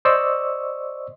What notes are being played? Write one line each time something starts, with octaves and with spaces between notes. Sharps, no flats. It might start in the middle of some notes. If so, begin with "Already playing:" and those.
C5 D5 D#5 C#6 E6